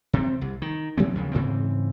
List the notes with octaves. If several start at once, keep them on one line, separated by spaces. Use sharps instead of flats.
C3 C4
C2
D#3
B2 F#3 G#3 C4
D#2 C#3 F3
G#2 C#3 E3 C4